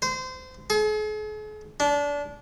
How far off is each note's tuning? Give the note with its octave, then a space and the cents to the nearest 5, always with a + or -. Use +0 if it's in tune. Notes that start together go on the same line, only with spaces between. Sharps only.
C5 -25
G#4 +45
D4 -25